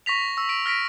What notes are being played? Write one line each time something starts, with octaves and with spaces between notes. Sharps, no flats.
C#6 A#6 B6 F7
C#6 E6
B6 D7
F6 A#6 B6 D7